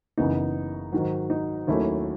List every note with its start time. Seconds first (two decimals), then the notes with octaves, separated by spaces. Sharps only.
0.18 F#1 F#2 C#3 E3 B3 D#4
0.92 G#2 D#3 F#3
1.30 D#4
1.67 D#2 D#3 F#3 A3 C#4 E4